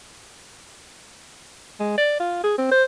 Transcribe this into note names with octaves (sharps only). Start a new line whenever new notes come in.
G#3
D5
F4
G#4
C4
C5